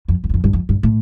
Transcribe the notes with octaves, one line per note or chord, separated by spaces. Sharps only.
F2
F2
E2
F2
G2
F2
G2
A2